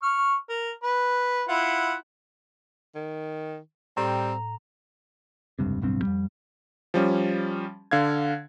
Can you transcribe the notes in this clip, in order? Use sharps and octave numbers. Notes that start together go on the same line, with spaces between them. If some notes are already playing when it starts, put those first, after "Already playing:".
C#6 F6
A#4
B4
E4 F4 F#5
D#3
A2 G3 C4 A#5
F1 C#2 G2 C3
D1 B1 G2 C4
F2 G3
F3 G3 C#4
D3 F5 G#6